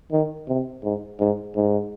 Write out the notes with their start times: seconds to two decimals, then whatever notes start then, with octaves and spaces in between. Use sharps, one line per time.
0.11 D#3
0.48 C3
0.83 G#2
1.20 G#2
1.56 G#2